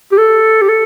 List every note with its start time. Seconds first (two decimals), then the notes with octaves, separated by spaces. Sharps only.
0.12 G4
0.18 A4
0.61 G4
0.69 A4